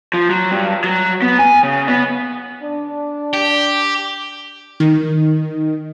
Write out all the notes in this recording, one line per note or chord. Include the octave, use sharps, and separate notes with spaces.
F3
F#3
G2
F#3
B3
G#5
C#3
B3
D4
G4
D#3